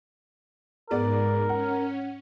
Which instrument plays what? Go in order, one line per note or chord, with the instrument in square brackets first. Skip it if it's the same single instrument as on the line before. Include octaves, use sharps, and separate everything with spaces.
[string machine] G#2 [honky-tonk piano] G#3 B3 D5 [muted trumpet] A#4
[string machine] C#4 [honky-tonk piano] F#5